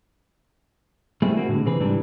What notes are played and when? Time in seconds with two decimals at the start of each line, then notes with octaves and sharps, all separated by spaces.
1.22 G3 A3 A#3 C4 E4 G#4
1.37 A#3 C4 F#4
1.48 A2 D3 G#3
1.65 C3 E3 C4 G#4 B4
1.80 G#2 C3 E3 G3 D4